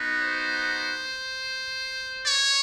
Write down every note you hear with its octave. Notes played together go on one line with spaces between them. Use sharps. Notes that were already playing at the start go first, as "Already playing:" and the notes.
Already playing: B3 D#4 F#4
C5
C#5